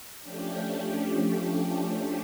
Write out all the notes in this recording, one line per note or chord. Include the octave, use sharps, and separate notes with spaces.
F3 A3 C#4 D4 G4